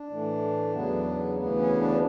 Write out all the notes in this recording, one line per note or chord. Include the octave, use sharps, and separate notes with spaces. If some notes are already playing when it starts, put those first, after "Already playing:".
Already playing: D4
A2 E3 A3
E2 C#3 F#3 B3
D2 C#3 E3 B3
C#4
D4